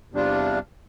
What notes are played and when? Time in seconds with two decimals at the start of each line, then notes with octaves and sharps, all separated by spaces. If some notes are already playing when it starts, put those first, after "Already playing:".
0.12 E2 C3 G3 D4 F4